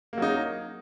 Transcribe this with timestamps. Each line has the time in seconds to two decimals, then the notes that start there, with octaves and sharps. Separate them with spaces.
0.13 A#3
0.18 F#3
0.22 D#4